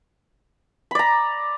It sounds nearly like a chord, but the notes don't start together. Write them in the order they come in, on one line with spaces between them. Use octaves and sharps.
B5 D5 A#5